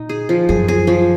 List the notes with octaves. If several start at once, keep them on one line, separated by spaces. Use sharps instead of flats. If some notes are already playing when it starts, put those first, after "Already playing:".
Already playing: A#2 D#4
G#4
F3
F#2 G#4
G#4
F3